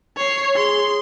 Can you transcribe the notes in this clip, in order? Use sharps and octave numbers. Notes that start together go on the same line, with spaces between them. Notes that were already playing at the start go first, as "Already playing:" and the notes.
C#5 C7
G#4 C6